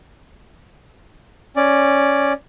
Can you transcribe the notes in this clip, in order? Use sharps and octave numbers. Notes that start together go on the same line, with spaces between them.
C#4 D5